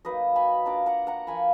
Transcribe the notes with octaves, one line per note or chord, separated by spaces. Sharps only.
F#3 A#3 D#4 B4 D#5
G#5 B5
A#3 D4 F4 A#5 D6
F#5 A#5
F#5 A#5
F3 A#3 F4 G#5 B5